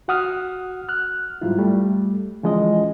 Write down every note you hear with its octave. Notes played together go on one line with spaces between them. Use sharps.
F#4 F#5 D#6 F6
F6 F#6
G#2 F#3 G3 E4 F4
G3 A3
E3 F3 G#3 C#4 D#5